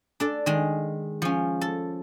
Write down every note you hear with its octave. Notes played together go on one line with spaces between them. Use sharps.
D4 A4 D5
D#3 G#3
F3 C#4
A4